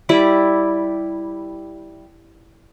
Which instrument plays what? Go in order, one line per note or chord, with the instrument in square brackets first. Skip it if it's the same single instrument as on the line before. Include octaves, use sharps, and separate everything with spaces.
[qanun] G3 E4 D5